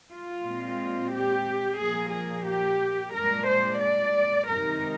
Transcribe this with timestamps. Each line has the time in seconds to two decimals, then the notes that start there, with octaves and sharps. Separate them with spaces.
0.11 F4
0.44 A#2 G#3 C4
1.12 G4
1.79 A#2 F3 A#3 G#4
2.13 G#4
2.47 G4
3.14 A#2 G#3 D4 A#4
3.48 C5
3.81 D5
4.49 C3 D#3 G#3 D#4 A#4